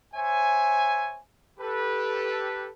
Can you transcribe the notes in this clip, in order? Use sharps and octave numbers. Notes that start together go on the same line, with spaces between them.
C5 C#5 E5 G#5
G4 A4 B4